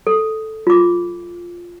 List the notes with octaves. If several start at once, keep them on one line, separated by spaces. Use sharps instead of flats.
A4
F4 D6